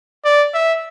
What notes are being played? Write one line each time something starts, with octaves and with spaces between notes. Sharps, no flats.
D5
E5